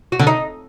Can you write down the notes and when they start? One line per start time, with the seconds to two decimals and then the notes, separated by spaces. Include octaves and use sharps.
0.12 F#4
0.19 D3
0.27 D#4